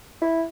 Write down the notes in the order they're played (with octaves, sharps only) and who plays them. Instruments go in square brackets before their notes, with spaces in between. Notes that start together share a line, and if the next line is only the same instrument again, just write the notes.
[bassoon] E4